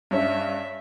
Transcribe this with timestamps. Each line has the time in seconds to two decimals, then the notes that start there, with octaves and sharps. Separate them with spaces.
0.11 G2 C#4 E5